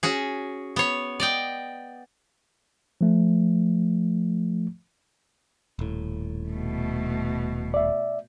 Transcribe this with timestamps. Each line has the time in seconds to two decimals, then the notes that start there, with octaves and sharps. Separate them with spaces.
0.03 C#4 F#4 G#4
0.76 B3 C#5
1.20 D5 D#5 G5
3.01 F3 A3
5.79 D#1 A2
6.49 B2 A3
7.74 D5 E5